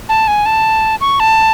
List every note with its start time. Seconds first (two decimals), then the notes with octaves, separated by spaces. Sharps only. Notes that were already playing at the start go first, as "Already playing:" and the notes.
0.09 A5
0.28 G#5
0.46 A5
1.01 C#6
1.20 A5